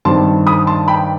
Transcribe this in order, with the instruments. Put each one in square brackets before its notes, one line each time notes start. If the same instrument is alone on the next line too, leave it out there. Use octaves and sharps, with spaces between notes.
[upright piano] G2 D#3 G3 C4 A5 C6
B5 D#6
A5 C6
G5 B5